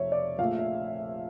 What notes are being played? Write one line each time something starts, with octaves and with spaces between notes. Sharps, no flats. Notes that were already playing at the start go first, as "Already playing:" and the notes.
Already playing: F1 F2 C#5 E5
D5
A#1 A#2 A3 F5
E5